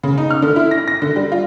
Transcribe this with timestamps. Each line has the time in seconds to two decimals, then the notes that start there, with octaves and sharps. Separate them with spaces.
0.03 C#3
0.18 D#4
0.31 F6
0.42 D3
0.56 E4
0.71 A#6
0.88 A#6
1.02 D3
1.16 G3
1.32 F4